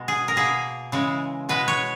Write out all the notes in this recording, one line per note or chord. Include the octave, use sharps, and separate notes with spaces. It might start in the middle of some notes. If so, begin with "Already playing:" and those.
Already playing: B2 G#3
G#4
A#4
B2 A#3 G#4
C#3 E3 G#3
B2 G#3 B4
C#5